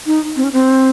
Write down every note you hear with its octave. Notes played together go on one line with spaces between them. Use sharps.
D#4
C4
C#4
C4